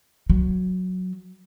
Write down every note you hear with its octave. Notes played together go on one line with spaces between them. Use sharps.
F#3